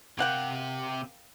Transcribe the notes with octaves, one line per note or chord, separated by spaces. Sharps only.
C3 A#3 G4 F#5 G5